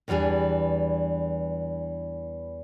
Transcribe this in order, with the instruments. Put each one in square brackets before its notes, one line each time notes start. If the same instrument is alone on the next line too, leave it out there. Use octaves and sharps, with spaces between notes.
[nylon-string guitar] E2 E3 G3 D4 G#4